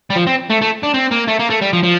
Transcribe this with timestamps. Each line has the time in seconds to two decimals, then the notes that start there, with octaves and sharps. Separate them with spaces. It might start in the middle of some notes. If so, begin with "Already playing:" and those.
0.10 G3
0.16 F3
0.27 C4
0.50 A3
0.61 A3
0.83 D4
0.94 C4
1.11 A#3
1.28 A3
1.40 A#3
1.50 A3
1.62 G3
1.73 F3
1.83 F3